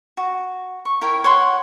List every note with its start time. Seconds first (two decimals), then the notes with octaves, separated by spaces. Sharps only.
0.17 F#4
0.85 C#6
1.01 E4 A#4 C#5 G5
1.24 C#5 F#5 C6 C#6